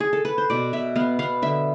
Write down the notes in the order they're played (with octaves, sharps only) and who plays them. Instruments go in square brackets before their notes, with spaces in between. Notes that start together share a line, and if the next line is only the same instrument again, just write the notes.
[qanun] G#4
A4
B4
C5
B2 D5
B2 E5
B3 F5
B3 F5
D3 E5